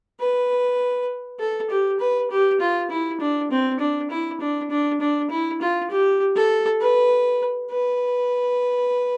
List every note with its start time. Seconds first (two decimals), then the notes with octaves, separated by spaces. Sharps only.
0.20 B4
1.40 A4
1.70 G4
1.99 B4
2.31 G4
2.60 F4
2.90 E4
3.20 D4
3.51 C4
3.80 D4
4.10 E4
4.40 D4
4.70 D4
5.00 D4
5.30 E4
5.61 F4
5.90 G4
6.36 A4
6.80 B4
7.71 B4